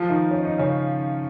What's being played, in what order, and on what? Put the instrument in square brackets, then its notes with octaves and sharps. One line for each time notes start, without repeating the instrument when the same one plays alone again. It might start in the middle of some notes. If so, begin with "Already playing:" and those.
Already playing: [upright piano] F3 F4
D#3 D#4
C#4
D#4
C#3 C#4